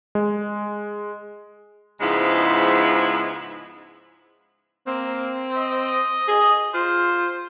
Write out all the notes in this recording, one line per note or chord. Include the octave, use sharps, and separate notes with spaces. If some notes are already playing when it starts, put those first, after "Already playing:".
G#3
G#2 C#3 F3 G#3 B3 E4
A#3 C4
D#5
G#4
F4 C5